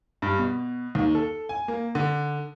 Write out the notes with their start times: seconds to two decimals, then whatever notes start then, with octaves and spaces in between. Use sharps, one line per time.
0.22 G2
0.38 B2
0.95 D#2
1.15 A4
1.49 G#5
1.68 A#3
1.95 D3